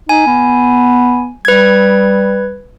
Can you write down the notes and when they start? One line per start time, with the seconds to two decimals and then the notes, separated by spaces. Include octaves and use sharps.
0.09 D#4 G#5
0.27 B3
1.45 G3 B4 G#6